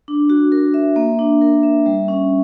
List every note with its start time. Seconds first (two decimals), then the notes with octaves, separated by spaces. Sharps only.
0.08 D4
0.30 F#4
0.52 A#4
0.74 E5
0.96 A#3
1.19 D4
1.41 A#4
1.63 E5
1.86 G3
2.08 C#4